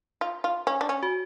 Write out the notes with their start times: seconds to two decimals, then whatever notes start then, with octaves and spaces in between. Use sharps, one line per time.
0.21 F4
0.44 F4
0.67 C#4
0.81 D4
0.89 C#4
1.03 F#4